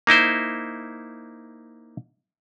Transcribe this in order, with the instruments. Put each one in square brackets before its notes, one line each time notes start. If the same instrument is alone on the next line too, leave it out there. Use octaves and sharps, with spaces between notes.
[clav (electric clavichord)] A#3 D#4 E4 C5